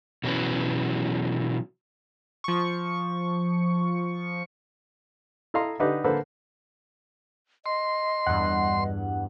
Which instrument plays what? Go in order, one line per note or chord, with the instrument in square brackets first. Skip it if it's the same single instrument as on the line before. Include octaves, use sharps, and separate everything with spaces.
[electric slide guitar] B2 E3 F#3 C#4 B4
[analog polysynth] F3 C#6
[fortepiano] E4 A4 D#5 F5 A#5 C6
D3 D4 D#4 G4 B4 D#5
D3 A#3 A4 B4 C5
[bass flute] D#5 [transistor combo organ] C6
[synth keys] E2 G2 [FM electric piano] F#5